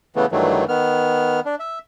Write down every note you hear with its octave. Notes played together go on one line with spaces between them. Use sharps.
C#3 E3 A3 B3
G2 D#3 E3 F#3 A3
D#3 B3 F6
D4
E5